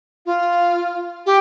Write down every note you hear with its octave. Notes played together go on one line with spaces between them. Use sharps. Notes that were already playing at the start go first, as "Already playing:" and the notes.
F4
G4